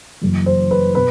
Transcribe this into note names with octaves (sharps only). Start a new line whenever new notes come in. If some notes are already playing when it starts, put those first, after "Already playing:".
F#1 F#2 E3
C5
B4
B2 B4